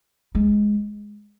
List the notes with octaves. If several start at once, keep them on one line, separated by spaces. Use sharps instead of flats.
G#3